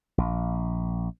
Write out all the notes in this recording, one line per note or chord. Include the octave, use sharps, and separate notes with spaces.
A#1